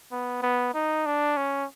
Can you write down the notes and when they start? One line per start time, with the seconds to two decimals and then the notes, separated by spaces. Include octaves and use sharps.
0.12 B3
0.43 B3
0.74 D#4
1.06 D4
1.37 C#4